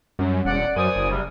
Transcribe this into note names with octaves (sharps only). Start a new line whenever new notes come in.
F#2 G3 C#4 C#5
E1 D5 F#5
F#2 A#4 C5 D5 G#5 D#6
F#1
C3 G3